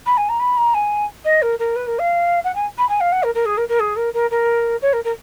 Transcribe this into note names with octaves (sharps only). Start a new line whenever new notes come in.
B5
G#5
A#5
B5
A#5
G#5
D#5
A#4
A#4
B4
A#4
F5
F#5
G#5
B5
G#5
F5
F#5
A#4
A#4
G#4
A#4
A#4
G#4
A#4
A#4
A#4
C#5
A#4
A#4